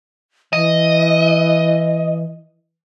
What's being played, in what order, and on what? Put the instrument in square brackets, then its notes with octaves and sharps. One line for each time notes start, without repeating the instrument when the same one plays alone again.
[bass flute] E3 [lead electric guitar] D#5